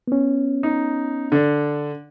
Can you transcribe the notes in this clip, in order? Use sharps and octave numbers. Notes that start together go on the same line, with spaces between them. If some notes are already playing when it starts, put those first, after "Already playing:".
B3 C#4
D#4
D3 D4